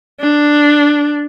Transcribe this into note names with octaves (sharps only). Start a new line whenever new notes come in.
D4